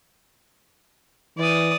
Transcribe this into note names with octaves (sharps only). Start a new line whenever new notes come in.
E3 D5 D#6